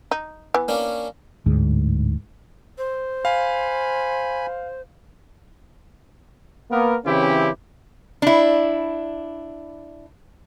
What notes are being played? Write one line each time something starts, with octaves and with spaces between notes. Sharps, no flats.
D#4
E3 B3
A#3 C#4 D4
D1 D2 G#2
C5
F5 G#5 B5
A#3 B3 A#4
C#3 E3 C4 C#4 E4 G4
D4 E4